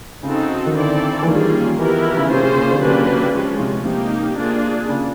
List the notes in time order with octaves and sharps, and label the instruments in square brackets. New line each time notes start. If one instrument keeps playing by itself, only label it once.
[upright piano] C#3 [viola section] C4 D#4 F#4 A4
[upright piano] D#3
[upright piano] D3 [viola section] C4 E4 A4 D5
[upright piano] E3
[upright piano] D#3 [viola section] G3 A#3 C#4 F4 G#4
[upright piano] E3 [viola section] B3 E4 G4 A#4
[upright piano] F3
C#3
[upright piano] C3 [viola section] A#3 C#4 F4 G#4 C5
[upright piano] C3
C#3
D3
C3
[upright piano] C#3 [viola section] F#3 A#3 D4 G4 B4
[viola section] F3 G#3 C#4
[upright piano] C3
[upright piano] C3 [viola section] A#3 D#4 G4
[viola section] A#3 D4 F4 G#4
[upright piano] C#3